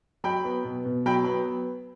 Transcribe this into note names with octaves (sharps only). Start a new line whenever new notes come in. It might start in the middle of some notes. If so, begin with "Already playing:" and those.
F#3 G5 B5
B3
B2
B2
F#3 G5 B5
B3 B5